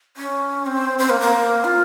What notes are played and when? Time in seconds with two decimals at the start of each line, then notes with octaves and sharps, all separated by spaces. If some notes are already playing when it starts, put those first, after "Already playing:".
0.17 C#4
0.66 C4
0.99 C4
1.10 A#3
1.21 A#3
1.64 F4